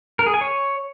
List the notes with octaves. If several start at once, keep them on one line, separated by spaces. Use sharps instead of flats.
A#4
G#4
G#5
C#5